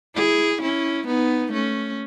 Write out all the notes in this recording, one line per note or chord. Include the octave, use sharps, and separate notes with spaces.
E4 G#4
C#4 E4
B3 D#4
A3 C#4